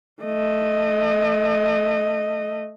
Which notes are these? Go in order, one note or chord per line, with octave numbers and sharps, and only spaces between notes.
A3 D#5